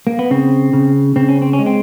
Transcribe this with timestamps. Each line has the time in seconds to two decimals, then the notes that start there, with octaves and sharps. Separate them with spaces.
0.07 A#3
0.19 B3
0.31 C#3 C4
0.73 C#3
1.16 C#3 C4
1.29 C#4
1.42 C4
1.53 C#4
1.59 G#3
1.66 C4